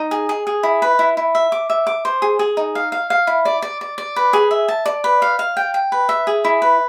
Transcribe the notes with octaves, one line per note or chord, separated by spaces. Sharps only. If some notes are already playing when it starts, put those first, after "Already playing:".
Already playing: D#4
G#4
G#4
G#4
E4
B4
E4
E4
E5
D6
E5
D6
C5
G#4
G#4
D#4
F5
F5
F5
E4
D5
D5
D5
D5
B4
G#4
E5
A5
D5
B4
F5
F5
G5
G5
B4
E5
G#4
E4
B4